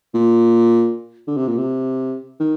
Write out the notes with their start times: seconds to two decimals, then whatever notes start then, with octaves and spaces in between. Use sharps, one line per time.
0.14 A#2
1.27 D3
1.37 C3
1.48 A#2
1.58 C3
2.40 D#3